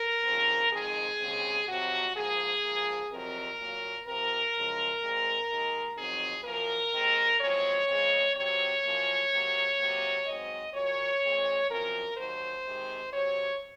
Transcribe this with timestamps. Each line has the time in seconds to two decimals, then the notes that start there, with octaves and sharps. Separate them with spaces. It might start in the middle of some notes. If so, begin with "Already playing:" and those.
Already playing: A#4
0.24 D#2 C#3 F3 C4
0.72 F2 D#3 G#3 C4 G#4
1.20 D#2 C#3 G#3 C4
1.68 F2 C3 F#3 C4 F#4
2.15 G#2 F3 A#3 G#4
2.63 G#2 F3 A#3
3.10 F2 C3 F#3 C4 A#4
3.59 A#2 F#3 A#3
4.06 C3 F3 C4 A#4
4.53 F#2 C#3 F3 G#3
5.01 A#2 G#3 C4
5.50 D#2 D#3 G#3
5.97 F2 D#3 F#3 C4 G#4
6.45 F#2 F3 A#3 A#4
6.92 D#2 D#3 G#3 C4
7.41 F#2 F3 G#3 C4 C#5
7.88 F2 C#3 G#3 C4
8.35 C3 F#3 C4 C#5
8.84 F#2 F3 A#3
9.32 C3 F#3 A#3
9.79 C3 F#3 A#3
10.27 G#2 F#3 C4 D#5
10.74 A#2 F#3 A#3 C#5
11.23 A#2 G#3 C4
11.70 F#2 F3 C4 A#4
12.17 D#2 D#3 F#3 C5
12.65 C3 D#3 G#3 C4
13.13 C3 F#3 C4 C#5